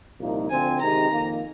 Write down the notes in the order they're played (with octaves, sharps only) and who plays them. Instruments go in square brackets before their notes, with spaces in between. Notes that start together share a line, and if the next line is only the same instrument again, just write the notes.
[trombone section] C2 A#2 F3 A#3 D#4
[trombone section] D2 D3 F3 C4 [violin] G#5
[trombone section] C3 D#3 G#3 D#4 G4 [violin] A#5
[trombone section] F2 D#3 A#3